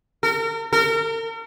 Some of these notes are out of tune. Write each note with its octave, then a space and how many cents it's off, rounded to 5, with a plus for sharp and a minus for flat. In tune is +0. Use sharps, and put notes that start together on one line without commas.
A#4 -40
A#4 -40